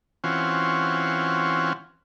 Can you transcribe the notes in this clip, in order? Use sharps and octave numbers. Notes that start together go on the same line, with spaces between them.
E3 C4 C#4 F4 F#4